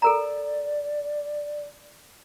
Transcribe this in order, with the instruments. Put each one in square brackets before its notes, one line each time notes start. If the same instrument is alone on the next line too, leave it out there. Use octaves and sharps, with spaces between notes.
[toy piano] A4 A#4 A#5 [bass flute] D5